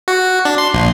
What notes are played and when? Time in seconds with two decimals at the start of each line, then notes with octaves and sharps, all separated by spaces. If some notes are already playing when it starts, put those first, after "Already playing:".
0.08 F#4
0.45 D4
0.58 C6
0.74 A#1